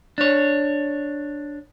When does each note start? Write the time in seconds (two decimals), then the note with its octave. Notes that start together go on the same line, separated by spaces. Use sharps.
0.18 D4 C#5